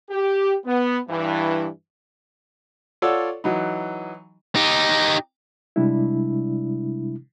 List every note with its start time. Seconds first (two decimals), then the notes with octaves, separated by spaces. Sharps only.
0.10 G4
0.66 B3
1.09 G2 E3
3.02 F4 A4 C#5 D5 F#5 E6
3.44 E3 F#3 D#4
4.56 D#4 G4
5.76 C3 G3 G#3 D4 E4